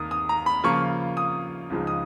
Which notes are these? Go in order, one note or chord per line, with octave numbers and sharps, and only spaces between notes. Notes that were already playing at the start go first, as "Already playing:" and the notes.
Already playing: D#2 D#3 A#3 D#6
D#6
A#5
B5
C#3 F3 A#3 F4 C#6
D#6
C#2 C#3 F3 G#3 D#4
D#6